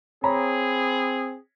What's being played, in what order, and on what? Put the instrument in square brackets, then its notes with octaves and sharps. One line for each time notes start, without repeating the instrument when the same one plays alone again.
[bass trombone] C4 [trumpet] G#4 [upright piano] C#5 A#5 B5